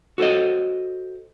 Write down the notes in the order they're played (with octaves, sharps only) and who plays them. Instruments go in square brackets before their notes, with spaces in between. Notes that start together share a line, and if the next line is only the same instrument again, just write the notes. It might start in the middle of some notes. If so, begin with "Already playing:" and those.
[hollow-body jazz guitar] F#4 A4 C5 D#5